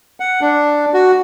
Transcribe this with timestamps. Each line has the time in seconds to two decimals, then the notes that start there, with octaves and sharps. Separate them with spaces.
0.20 F#5
0.41 D4
0.94 F#4